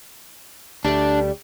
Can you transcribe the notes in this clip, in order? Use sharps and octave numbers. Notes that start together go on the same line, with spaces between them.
D2 G3 A3 D4